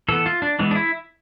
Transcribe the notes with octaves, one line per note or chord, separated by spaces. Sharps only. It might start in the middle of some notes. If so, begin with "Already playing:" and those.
E3 B3 A4
F4
D4
E3 G#3 B3 D4
D4
E4